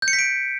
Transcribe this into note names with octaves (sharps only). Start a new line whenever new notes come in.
G6
C#7
B6
D7